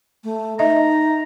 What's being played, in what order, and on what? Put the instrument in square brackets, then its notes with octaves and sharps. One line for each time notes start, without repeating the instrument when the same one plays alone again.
[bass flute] A3
[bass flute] D#4 [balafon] D#5 E5 [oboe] A#5